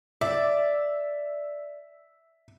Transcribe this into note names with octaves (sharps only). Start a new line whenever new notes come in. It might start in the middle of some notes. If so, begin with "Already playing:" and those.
D5 E5